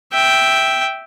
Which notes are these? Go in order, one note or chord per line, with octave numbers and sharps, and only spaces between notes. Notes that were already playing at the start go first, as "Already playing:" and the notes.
E5 G5